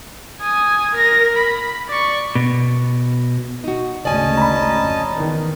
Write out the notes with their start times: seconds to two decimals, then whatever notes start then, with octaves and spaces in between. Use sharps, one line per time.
0.42 G#5 D#6
0.95 A#4 A#6
1.37 B5
1.89 D5 C#6
2.35 B2
3.64 D#4 F#4
4.05 G#1 D2 C#3 C#4 D5 D#5 G#5 A5
4.37 A#5 B5
4.77 F2
5.13 E2 D#3